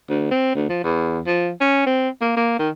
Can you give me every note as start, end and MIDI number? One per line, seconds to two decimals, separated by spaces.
0.09 0.30 38
0.31 0.53 60
0.55 0.65 38
0.69 0.80 53
0.84 1.20 40
1.26 1.51 53
1.60 1.82 61
1.86 2.09 60
2.21 2.34 58
2.36 2.56 58
2.59 2.69 51